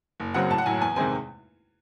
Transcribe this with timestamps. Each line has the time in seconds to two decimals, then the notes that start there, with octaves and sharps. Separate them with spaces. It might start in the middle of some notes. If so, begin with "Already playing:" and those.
0.20 F#1
0.34 F#2 C#3 F#3 C4 F#5
0.50 A1 A5
0.58 F#5
0.66 A2 F#3 G#5
0.81 E2 G#5
0.96 C3 D#3 G#3 C4 G#5